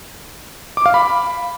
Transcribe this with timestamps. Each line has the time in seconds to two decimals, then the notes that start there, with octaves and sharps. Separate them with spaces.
0.77 D6
0.86 F5
0.94 B5